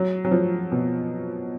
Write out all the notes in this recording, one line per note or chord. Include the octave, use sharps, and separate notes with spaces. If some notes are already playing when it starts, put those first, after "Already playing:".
Already playing: F#3
F#3
F3
B2